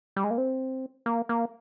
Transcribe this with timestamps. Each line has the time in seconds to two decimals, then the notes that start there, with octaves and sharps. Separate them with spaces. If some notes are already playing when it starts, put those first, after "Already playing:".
0.16 G3
0.24 G#3
0.30 A#3
0.38 C4
1.06 A#3
1.29 A#3